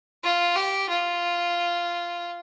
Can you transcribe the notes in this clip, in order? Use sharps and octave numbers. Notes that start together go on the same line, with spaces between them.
F4
G4
F4